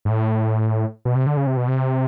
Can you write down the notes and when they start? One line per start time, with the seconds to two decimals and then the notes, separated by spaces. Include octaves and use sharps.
0.05 G#2
0.10 A2
1.05 B2
1.15 C3
1.27 D3
1.37 C#3
1.47 C3
1.57 B2
1.68 C3